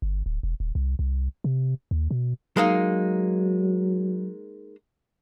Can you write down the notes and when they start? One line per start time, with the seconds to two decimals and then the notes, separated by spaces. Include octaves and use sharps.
0.02 G1
0.26 D1
0.43 E1
0.60 D#1
0.75 C2
0.99 C2
1.44 C3
1.91 D#2
2.11 B2
2.57 F#3 G#3 A#3 D#4